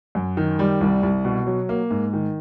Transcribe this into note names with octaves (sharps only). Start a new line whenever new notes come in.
F#2
D#3
G3
C2
C2
B2
F#3
A#3
G#2
D#3